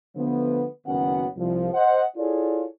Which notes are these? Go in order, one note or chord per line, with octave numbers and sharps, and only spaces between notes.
D3 F3 A3 B3
F#1 D#3 B3 C#4 F#4 F#5
C2 F3
C5 D#5 F#5
E4 F4 G#4 A4 C#5 D5